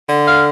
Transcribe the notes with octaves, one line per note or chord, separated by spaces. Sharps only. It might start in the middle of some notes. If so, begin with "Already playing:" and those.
D3
F5